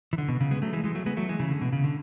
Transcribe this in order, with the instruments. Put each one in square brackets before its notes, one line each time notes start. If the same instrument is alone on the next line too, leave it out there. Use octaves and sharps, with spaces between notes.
[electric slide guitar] E3
D3
B2
C#3
G#3 B3
F#3 A3
E3 G#3
E3 G#3
F#3 A3
G#3 B3
F#3 A3
E3 G#3
C#3 E3
D3
B2
C#3
D3